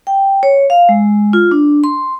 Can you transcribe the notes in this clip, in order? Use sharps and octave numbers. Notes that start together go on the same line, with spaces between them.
G5
C#5
F5
G#3
F4
D4
C6